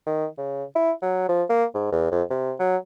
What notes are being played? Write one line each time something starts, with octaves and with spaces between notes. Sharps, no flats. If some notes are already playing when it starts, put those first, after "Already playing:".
D#3
C#3
E4
F#3
F3
A#3
G#2
E2
F2
C3
F#3